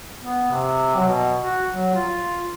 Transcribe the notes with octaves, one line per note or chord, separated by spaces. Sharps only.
B3
C3
F#3
B2
F#4
F#3
F4